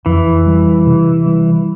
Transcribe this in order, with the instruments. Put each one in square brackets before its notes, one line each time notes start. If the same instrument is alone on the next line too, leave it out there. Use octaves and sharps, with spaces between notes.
[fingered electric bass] F2 [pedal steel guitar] E3
[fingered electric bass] G3
C3
G3